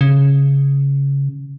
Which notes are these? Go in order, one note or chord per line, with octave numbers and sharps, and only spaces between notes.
C#3